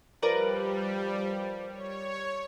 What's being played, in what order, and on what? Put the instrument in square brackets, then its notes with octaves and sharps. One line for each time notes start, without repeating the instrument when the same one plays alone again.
[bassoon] F3 [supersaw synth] G3 [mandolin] A#4 B4 D5
[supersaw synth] C#5